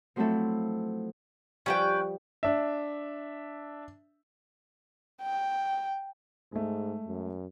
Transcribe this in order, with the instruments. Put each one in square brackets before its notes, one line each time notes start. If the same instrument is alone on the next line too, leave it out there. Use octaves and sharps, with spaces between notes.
[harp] F3 F#3 A3 C4 E4 A4
[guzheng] F3 G3 [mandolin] C#4 B4 G5
[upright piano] D4 E5
[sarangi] G5
[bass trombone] G#2 [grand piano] G#3 A3
[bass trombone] F#2